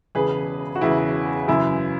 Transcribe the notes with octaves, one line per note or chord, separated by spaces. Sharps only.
E1 E2 C#3 G#4 B4
F#4
E1 E2 C#3 E4 G#4
F#2 C#3 E3 E4